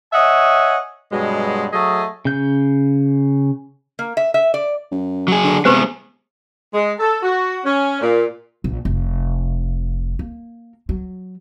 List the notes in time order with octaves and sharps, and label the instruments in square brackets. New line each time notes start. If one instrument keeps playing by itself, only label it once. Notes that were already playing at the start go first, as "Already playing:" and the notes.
[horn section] C#5 D#5 E5 F#5 G#5
G2 B2 F#3 G#3
F#3 A3 G#4 D#5
[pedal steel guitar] C#3 G6
[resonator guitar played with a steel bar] A#3
E5
E5
D5
[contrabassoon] F#2
[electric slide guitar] F#3 G#4
[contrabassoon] D3
[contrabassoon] C3 [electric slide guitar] G#3 B3 [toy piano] G4 B4 C5
[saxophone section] G#3
A4
F#4
C#4
A#2
[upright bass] A#1
F1
A#3
F#3